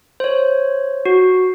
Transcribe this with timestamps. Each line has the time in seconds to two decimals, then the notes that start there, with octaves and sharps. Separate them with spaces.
0.20 C5 C#5
1.06 F#4